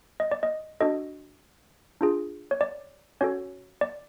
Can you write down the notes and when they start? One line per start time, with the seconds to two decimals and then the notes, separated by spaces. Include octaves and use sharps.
0.20 D#5
0.31 D5
0.43 D#5
0.80 D4 F#4 A4 D#5
2.01 D4 F4 G#4
2.51 C#5
2.61 D5
3.21 C#4 F#4 A4 C#5
3.81 D5